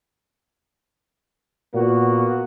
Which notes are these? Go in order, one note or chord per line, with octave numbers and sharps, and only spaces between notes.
A#2 A#3 B3 F#4